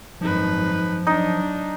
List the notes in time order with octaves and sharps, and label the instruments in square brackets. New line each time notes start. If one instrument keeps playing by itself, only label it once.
[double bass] G#1 F#2 [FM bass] F3 [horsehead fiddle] D#4 B4
[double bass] F#3 [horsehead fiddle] D4 [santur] D#4